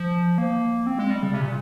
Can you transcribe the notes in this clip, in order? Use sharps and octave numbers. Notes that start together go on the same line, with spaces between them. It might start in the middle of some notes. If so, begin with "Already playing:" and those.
Already playing: F3
A#3
C4
G#3
G3
C#3
C3
A#2